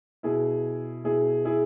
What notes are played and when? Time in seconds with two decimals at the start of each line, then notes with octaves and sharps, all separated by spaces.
0.23 B2 E4 G#4
1.04 B2 E4 G#4
1.45 E4 G#4